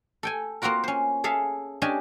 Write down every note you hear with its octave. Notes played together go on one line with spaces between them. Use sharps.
A4 G5 G#5
A#3 C4 F4 F#4 A#4
C#4 C5
G#4 A4 E5 F5
C#4 D4 G4 D#5 G#5 A5